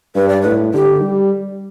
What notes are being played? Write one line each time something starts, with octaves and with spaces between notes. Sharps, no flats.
G2 B4
D5
A2 B4
D3 G4
G3